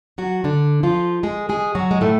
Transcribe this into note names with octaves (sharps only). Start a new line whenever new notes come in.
F#3 F#4
D3 D4
F3 F4
G#3 G#4
G#3 G#4
F#3 F#4
G#3
A2 A3